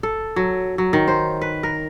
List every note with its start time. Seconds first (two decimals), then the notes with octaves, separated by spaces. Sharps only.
0.03 A4
0.36 F#3
0.78 F#3
0.93 D#3
1.08 C5
1.41 B4
1.63 A#4